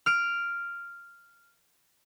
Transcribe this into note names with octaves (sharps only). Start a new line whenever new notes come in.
F6 D7